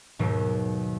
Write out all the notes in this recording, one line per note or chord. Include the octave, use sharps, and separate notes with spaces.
D#2 G#2 B2 D#3 F#3 G3